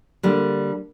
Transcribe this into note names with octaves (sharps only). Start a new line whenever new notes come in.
D3 G3 A#3